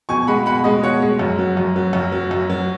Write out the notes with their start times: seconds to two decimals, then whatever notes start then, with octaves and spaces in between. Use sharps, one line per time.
0.09 B2 G#5 C#6
0.27 G#3 F#5 B5
0.46 B2 F#5 B5
0.64 G#3 D#5
0.83 B2 C#5 F#5
1.02 G#3
1.19 F#2
1.39 F#3
1.57 F#2
1.76 F#3
1.93 F#2
2.12 F#3
2.31 F#2
2.50 F#3